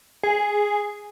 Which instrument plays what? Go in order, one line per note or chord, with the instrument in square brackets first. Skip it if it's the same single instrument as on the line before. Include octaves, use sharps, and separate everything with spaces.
[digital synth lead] G#4